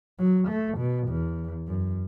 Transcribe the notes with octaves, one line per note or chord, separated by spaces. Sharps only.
F#3
A3
B2
E2
F#2